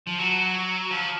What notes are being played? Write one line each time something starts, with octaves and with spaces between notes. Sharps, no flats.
F3
F#3
F3